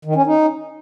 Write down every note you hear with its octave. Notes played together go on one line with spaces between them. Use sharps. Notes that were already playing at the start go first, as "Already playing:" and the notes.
D#3
C#4
D#4